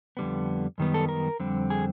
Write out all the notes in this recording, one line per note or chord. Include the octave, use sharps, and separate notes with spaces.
F2 D3 G3 B3
F#2 D#3 G3 B3
A4
A#4
F2 D3 G3 C4
G#4